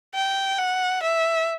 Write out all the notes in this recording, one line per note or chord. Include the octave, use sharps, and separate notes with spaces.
G5
F#5
E5